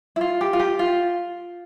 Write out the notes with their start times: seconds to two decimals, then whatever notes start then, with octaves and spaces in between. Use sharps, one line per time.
0.16 E4
0.21 F4
0.41 G4
0.53 F4
0.60 G4
0.79 F4